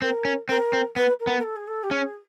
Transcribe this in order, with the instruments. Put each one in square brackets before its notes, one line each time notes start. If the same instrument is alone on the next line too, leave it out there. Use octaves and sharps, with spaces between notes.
[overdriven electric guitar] C4 [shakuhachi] A#4
[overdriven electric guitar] C#4
[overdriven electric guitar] C4 [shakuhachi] A#4
[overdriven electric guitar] C4
[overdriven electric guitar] B3 [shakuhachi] B4
[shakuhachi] A#4
[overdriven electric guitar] B3
[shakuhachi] A#4
A4
G#4
A4
G4
[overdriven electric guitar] C#4 [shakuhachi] G#4